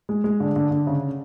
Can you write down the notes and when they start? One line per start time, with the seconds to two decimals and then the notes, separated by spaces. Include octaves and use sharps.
0.09 G#3
0.24 G#3
0.40 D3
0.56 D3
0.71 D3
0.87 C#3